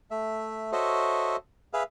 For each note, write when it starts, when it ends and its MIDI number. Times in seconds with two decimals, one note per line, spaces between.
0.11 0.72 57
0.11 0.72 76
0.72 1.36 66
0.72 1.36 69
0.72 1.36 72
0.72 1.36 73
0.72 1.36 75
0.72 1.36 76
1.73 1.83 68
1.73 1.83 71
1.73 1.83 76
1.73 1.83 77